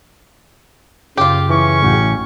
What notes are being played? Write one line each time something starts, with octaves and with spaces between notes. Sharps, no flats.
F#2 C#3 F4 G4
E3 C#4 C#6
A1 F#4 G5